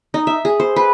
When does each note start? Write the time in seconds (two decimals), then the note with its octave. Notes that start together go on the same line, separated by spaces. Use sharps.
0.14 D#4
0.27 E5
0.45 G#4
0.60 C5
0.76 B4